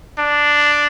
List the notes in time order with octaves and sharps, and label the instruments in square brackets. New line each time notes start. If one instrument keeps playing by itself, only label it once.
[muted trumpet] D4